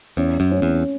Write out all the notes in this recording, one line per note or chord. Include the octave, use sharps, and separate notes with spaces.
E2 C#4
F#2
C#4
E2